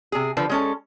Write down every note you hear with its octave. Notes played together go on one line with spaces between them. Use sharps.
C3 G#4
D3 F3 B4
G#3 C#4 A4